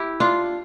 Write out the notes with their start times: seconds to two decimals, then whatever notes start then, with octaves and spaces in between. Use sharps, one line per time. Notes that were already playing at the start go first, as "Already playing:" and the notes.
Already playing: E4 G4
0.20 D4 F4